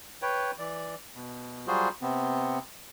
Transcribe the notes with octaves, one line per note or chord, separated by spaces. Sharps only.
B4 C#5 G5
E3 D5
B2
F#3 G3 F4 F#4 G#4 C5
C3 B3 C4